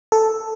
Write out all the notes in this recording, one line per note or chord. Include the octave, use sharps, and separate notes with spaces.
A4